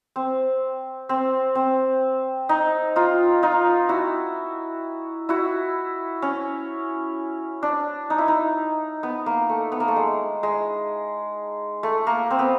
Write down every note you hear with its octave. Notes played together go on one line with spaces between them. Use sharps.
C4
C4
C4
D#4
D#4 F4
D#4 F4
E4 F#4
E4 F#4
C#4
D4
D#4
E4
D#4
B3
A#3
A3
B3
A#3
A3
G#3
G#3
A3
A#3
C4
B3